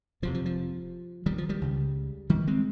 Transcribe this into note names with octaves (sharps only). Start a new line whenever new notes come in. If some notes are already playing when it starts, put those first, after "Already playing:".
F1 F2 C3 F3
F3
F3
D#3 G3
F3
D#3 G3
C#2 C#3
D#3 G3
G#3 C4